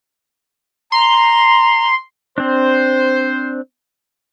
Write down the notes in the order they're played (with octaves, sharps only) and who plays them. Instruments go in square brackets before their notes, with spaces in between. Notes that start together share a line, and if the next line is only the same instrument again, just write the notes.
[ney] A#5 [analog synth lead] C6
[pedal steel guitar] C4 D4 [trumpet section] C5